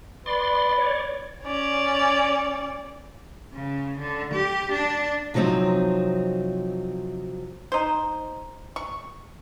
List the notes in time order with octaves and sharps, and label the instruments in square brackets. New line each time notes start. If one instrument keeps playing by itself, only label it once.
[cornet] B4 [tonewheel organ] D5 C6
[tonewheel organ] C#5 D5
[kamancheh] C#4 D5
[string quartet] C#3
D3
G4
D4
[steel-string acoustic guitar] C3 F3 F#3 C4 D#4
[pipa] D#4 C5
C#6